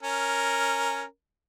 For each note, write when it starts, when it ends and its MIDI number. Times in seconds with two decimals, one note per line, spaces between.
0.03 1.04 61
0.03 1.04 70